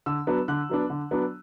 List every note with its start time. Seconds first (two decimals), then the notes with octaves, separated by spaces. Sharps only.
0.06 D3 E6
0.27 F#3 B3 D4
0.48 D3 F#6
0.69 F#3 B3 D4
0.90 D3
1.11 F#3 B3 D4